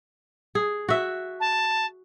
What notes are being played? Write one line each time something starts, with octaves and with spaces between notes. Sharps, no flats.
G#4
F#4 E5
A5